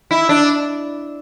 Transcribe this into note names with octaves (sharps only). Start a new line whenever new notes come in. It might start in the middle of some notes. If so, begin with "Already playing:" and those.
E4
D4